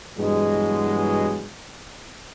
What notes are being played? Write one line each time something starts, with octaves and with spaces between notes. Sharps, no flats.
G2 B2 E3 F#3 G#3